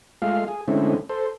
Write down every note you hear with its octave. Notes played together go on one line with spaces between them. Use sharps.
G#3 A3 F4 F5
G#4
D3 G#3 A3 C4 C#4 E4
A4 C5